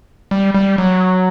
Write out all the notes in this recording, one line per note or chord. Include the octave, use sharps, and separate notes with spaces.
G3
G3
F#3